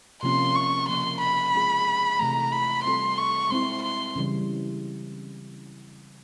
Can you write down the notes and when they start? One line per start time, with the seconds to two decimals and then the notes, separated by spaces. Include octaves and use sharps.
0.22 C3 F3 A#3 C#4 F4 C6
0.55 C#6
0.88 C#3 F3 A#3 C6
1.21 B5
1.53 G#3 C4 F4 G#4
2.19 C3 E3 A3 A#5
2.52 B5
2.84 G3 C4 F4 A4 C6
3.18 C#6
3.50 G#3 C4 E4 C6
3.83 C6
4.16 C#3 E3 G3